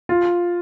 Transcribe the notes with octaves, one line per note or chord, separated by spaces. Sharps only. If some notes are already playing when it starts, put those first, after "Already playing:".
F4